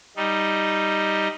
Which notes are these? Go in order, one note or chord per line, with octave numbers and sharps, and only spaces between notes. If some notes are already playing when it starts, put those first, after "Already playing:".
G3 D#4